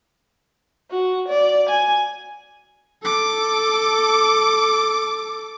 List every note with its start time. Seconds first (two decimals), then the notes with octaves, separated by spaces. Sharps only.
0.91 F#4
1.29 D5
1.69 G#5
3.02 A4 D6